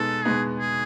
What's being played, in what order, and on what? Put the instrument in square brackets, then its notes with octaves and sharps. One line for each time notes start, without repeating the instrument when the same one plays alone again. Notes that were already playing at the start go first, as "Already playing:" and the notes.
Already playing: [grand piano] B2 G#3 B3 D#4 [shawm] A4
[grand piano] B2 G#3 B3 D#4 [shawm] G#4
[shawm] G#4